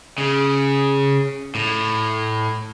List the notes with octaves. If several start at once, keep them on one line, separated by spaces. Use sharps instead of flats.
C#3
A2